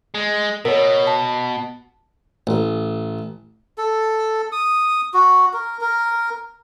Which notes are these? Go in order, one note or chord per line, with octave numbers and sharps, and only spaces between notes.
G#3
B2 A#4 C#5
A5
A1
A4
D#6
F#4
A#4
A#4